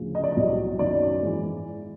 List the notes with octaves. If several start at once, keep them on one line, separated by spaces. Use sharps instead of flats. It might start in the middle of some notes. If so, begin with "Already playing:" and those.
Already playing: D2 C#3 F3
D#5
D5
C2 B2 F#3 D#5
F#2 D#3 F#3 D5
G#2 E3